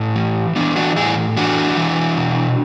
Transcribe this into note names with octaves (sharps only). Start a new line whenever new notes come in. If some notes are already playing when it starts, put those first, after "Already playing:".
Already playing: A2 C#4 E4
E3
E3 B3 D4
D4 F#4
A2 E4 G#4
E3 D4 F#4
E3
B2